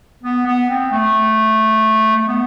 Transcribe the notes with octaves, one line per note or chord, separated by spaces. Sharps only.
B3
B3
C4
A3
A3
B3